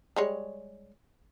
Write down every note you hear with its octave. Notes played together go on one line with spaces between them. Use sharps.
G3 G#3 C#5